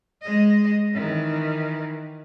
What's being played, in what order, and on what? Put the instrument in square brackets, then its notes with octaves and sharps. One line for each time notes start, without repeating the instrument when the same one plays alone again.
[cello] G#3 D#5
D#3 E3